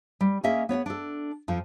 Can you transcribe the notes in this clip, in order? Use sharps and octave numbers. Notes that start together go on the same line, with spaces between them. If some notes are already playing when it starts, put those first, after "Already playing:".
G3
A#3 C#4 G#4 D#5 E5
B3 C#5 E5 F#5
D4 A4
F2 F3